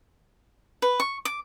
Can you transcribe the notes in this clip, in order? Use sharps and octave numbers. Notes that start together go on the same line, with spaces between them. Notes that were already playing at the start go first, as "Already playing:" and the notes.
B4
C#6
D6